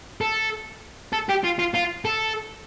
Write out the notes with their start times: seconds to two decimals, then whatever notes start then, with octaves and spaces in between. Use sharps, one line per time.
0.21 A4
1.13 A4
1.29 G4
1.44 F4
1.59 F4
1.74 F4
2.05 A4